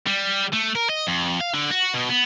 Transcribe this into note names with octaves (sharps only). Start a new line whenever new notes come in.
G3
A3
A#4
D#5
F2
F5
D3
F#4
B2
B3